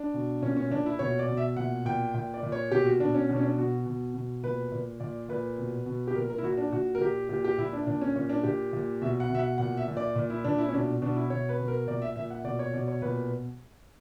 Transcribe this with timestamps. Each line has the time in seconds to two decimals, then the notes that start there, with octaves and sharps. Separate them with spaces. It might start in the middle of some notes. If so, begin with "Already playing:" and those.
Already playing: D4
0.14 B2
0.42 A#2 C#4
0.57 C#4
0.70 A#2 D4
0.86 E4
0.99 B2 C#5
1.19 D5
1.28 B2
1.37 E5
1.56 A#2 F#5
1.85 A#2 G5
2.14 A#2 G5
2.34 D5
2.43 A#2
2.52 C#5
2.71 B2 G4
2.85 F#4
3.00 B2 D4
3.14 C#4
3.29 B2 D4
3.36 C#4
3.43 D4
3.58 B2 F#4
3.86 B2
4.14 B2
4.43 A#2 B4
4.72 A#2
5.00 A#2 D5
5.29 A#2 B4
5.58 B2
5.86 B2
6.07 G4
6.15 A#2 A#4
6.30 A#4
6.38 E4
6.43 A#2 F#4
6.58 D4
6.73 A#2 F#4
6.95 A#4
7.00 A#2 G4
7.29 A#2 G4
7.44 G4
7.58 A#2 E4
7.73 D4
7.87 A#2 D4
8.02 C#4
8.16 A#2 C#4
8.29 D4
8.43 A#2 G4
8.73 A#2
9.02 B2 E5
9.20 F#5
9.29 B2
9.35 E5
9.39 F#5
9.58 A#2 F#5
9.77 E5
9.88 A#2
9.97 D5
10.16 A#2
10.30 E4
10.44 A#2 D4
10.58 E4
10.68 C#4
10.74 B2 D4
11.02 B2 D4
11.16 E4
11.30 B2 C#5
11.49 B4
11.59 B2
11.68 A#4
11.87 A#2 D5
12.02 E5
12.16 A#2 E5
12.30 F#5
12.44 B2 D5
12.59 C#5
12.73 B2 D5
12.88 C#5
13.02 A#2 B4